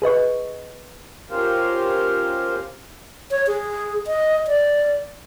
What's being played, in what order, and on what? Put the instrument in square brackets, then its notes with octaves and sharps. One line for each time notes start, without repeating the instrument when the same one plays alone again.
[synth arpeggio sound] G#4 B4 D#5 C#6
[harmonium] C#4 F4 G4 A#4 C5 F5
[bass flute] C#5
G#4
D#5
D5